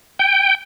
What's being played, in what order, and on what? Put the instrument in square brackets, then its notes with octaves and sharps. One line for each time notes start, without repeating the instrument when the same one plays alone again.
[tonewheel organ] G5